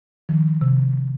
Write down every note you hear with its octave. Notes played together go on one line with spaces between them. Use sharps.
D#3 F3
C3